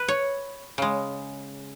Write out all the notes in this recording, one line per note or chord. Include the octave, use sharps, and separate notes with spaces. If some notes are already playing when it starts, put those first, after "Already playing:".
Already playing: B4
C#5
C#3 G#3